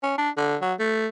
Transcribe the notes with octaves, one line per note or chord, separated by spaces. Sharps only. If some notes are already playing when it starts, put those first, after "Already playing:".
C#4
D4
D3
F#3
A3